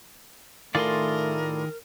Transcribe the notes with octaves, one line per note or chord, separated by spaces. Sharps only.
A2 D#3 A3 F4 G#4 A#4 D5 C6